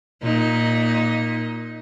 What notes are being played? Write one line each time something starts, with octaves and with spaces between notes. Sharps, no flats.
A#2 D#4